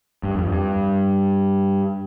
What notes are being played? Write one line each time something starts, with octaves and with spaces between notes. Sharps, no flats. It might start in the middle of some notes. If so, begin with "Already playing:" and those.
G2
F2
G2